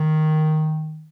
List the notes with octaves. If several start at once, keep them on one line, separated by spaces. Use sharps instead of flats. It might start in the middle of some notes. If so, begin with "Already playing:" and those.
Already playing: D#3